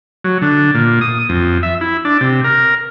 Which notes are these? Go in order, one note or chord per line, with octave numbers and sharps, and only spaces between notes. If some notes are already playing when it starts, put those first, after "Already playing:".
F#3
D3
A#2
D#6
F2
E5
E4
D4
C3
A#4